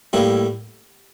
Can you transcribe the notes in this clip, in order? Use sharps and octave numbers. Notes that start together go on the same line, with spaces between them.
A2 G3 A#3 E4